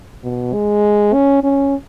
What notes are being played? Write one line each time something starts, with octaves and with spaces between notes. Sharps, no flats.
B2
G#3
C#4
C#4